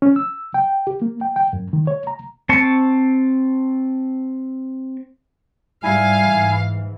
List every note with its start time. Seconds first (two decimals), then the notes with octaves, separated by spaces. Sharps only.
0.02 C#4
0.16 E6
0.54 G5
0.87 G4
1.02 A#3
1.21 G5
1.36 G5
1.53 F#2
1.73 D#3
1.87 C#5
2.07 A#5
2.49 C4 A5 C#6
5.83 G#2 G3 E4 F5 G#5
6.24 G#2 E3